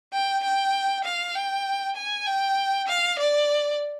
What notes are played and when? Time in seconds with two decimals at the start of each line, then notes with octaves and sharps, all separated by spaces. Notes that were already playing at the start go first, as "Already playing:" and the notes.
0.13 G5
0.43 G5
1.05 F5
1.35 G5
1.96 G#5
2.27 G5
2.88 F5
3.19 D5